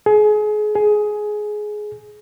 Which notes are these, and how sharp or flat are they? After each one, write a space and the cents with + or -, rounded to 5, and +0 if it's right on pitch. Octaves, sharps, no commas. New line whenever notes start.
G#4 +30
G#4 +15